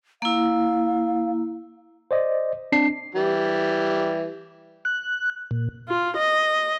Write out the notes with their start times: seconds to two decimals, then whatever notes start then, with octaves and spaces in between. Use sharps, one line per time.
0.22 A#3 E4 F5
2.11 C5 D5 D#5
2.72 C4 D4 C7
3.15 E3 G3
4.85 F#6
5.51 A#2
5.88 F4
6.17 D#5